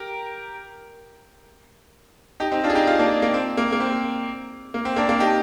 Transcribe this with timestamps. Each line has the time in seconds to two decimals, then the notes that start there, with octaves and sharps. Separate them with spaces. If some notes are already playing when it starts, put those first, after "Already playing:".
Already playing: G4 A#4
2.40 D#4 G4
2.52 C4 D#4
2.64 D4 F4
2.70 G#4
2.75 D#4 G4
2.87 F4 G#4
2.99 A#3 D4
3.22 A#3
3.34 C4
3.57 A#3
3.72 A#3
3.80 C4
4.74 A#3
4.85 C4
4.96 A#3 D4
5.09 A#3 D4
5.20 D#4 G4